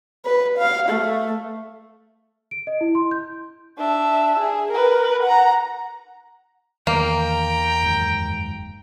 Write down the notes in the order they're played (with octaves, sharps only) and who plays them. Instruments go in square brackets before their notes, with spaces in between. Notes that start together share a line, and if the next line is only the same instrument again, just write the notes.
[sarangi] B4
F5
A3
[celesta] D7
D#5
E4
C6
G6
[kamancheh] D4 E5
G#4
A#4 B4
F#5 A#5
[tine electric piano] E2 [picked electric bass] D#3 [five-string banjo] A#3 [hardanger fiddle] G5 A#5
[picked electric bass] F#1 D#2 G#2